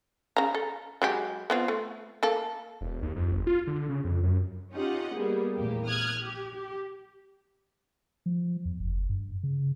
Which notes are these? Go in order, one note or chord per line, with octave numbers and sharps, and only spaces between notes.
C#3 A#5
A4
F#3 G#3 G4
B3 C4 F4
A3
A#3 A4
E1
D#2
F2
G1
F4
D3
C#3
F2
F#2
C#4 D#4 F4 G4 D#5 F#5
G3 A#3 B3 G#4
A#1 E2 A2 A#3 G4
D#6 F6 F#6 G#6
G4
G4
F3
E2
F#1
G2
C#3